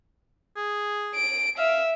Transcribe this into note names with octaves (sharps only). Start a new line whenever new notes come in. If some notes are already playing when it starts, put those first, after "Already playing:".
G#4
D7
E5 F5